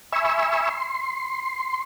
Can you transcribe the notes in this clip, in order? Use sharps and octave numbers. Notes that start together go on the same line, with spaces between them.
E5 G#5 B5 C#6 E6
C6